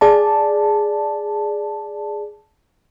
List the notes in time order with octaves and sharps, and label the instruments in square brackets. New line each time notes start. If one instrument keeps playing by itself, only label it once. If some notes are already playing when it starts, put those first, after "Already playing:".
[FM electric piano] G#4 D5 A5